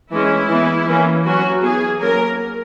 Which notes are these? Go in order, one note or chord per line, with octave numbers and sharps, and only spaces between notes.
E3 G#3 C#4 E4
E3 B3
E3 A#3 C#4
F#3 C#4 F#4
E3 B3 G#4
F#3 A#3 C#4 A#4